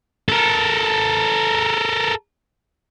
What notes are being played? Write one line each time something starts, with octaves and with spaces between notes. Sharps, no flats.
A4 A#4